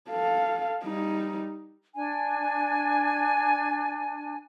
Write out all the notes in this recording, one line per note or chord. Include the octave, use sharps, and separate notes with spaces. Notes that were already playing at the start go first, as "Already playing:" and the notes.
A4 F5
G3 D#4
D4 G#5